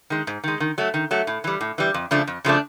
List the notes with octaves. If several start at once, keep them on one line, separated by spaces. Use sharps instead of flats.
D#3 G#3
G#2
D#3 G#3
D#3
F#3 A3
D#3
F#3 A3
A2
E3 G3
A2
E3 G3
F2
C#3 F3 A3 D4
F2
C#3 F3 A3 D4